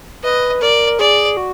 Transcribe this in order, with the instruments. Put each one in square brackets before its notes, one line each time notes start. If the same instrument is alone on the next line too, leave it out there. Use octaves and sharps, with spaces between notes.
[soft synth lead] B4 [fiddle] D#5
[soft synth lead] A#4 [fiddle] D5
[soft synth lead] G#4 [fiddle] D5
[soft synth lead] F#4